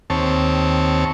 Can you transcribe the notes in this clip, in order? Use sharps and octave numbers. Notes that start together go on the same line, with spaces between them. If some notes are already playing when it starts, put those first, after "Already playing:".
D#2 C4 C#5 A5